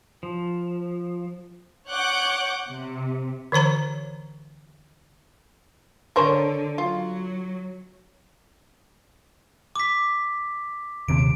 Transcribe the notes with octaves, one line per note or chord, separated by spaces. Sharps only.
F3
C#5 F#5 D6 F#6 G6
C3
D3 E3 C5 A#5
D3 A#4 C5 C#5
F#3 F4
D6 B6
D#1 D#2 C3 D7